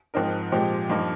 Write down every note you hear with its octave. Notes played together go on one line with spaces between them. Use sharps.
G#2 F3 C4 D#4 A#4
A#2 F3 G#3 C4 G4
G2 F3 A#3 D#4 A#4